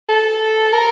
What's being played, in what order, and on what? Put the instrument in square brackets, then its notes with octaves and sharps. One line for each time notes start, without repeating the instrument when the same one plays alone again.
[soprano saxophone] A4
A#4